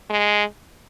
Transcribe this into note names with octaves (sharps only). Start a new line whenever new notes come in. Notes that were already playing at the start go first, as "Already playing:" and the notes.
G#3